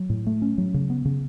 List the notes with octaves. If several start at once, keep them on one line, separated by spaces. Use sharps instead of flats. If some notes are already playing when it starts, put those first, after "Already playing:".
Already playing: F#3
A2
A3
C#4
F#3
C#3
B3
C#3